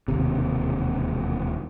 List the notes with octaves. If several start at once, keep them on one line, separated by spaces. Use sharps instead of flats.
E1 D#2 C3